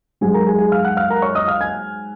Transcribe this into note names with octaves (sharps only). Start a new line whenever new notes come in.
G#2 F#3 G#4 G#5
A#4 A#5
G#4 G#5
G#4 G#5
F5 F6
F#5 F#6
F5 F6
A#4 A#5
C#5 C#6
D#5 D#6
F5 F6
G#5 G#6